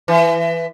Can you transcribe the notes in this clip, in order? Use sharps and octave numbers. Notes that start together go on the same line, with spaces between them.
E3